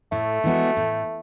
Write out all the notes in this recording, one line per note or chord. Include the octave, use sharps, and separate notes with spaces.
A2 A3
E3 G#3 B3 F#4
A2